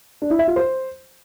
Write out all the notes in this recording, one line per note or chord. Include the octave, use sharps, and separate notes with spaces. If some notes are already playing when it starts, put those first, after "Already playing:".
D4
E4
E5
F4
C5